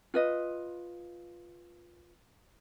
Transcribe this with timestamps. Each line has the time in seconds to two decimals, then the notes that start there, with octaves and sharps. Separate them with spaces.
0.14 F4 B4 D#5